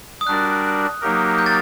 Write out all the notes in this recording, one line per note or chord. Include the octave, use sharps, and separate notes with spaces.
D#6
G3 D4 F#4 A#4 D5 F#6
F#3 A#3 D#4 G4 A#4
G6
A6